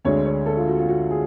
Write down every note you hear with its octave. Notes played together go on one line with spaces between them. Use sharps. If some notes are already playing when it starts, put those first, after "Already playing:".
D2 D3 G#3 C#5
C#5
A4
F4
F#4
F4
F#4
G#4